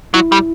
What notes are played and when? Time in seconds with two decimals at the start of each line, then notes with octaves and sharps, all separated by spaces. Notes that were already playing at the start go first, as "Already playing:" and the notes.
0.14 F#3 E4
0.32 G3